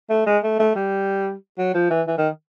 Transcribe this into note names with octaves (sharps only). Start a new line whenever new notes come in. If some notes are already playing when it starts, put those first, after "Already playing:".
A3
G#3
A3
A3
G3
F#3
F3
E3
E3
D#3